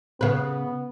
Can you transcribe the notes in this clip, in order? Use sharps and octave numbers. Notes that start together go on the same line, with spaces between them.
C#3 B3 B4